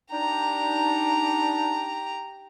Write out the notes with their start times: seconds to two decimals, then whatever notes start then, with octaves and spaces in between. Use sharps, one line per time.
0.12 D4 D#4 G4 A#5